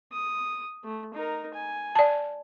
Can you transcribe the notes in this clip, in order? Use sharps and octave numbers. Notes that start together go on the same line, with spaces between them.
D#6
A3
D#4 A#4
G#5
D5 A5